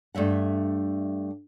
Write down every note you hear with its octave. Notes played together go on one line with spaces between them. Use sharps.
G2 A3 E5 F#5